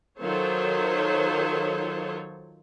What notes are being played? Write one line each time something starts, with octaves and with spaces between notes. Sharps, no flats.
D#3 F#3 F4 A4 C5 C#5